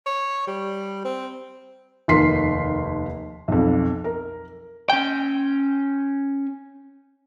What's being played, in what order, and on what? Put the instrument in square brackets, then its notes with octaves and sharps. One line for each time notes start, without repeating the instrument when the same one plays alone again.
[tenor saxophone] C#5
G3
C4
[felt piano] F1 D#2 A#4 C6 B6 C7
B1 F2
A#4
[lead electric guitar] C#4 G5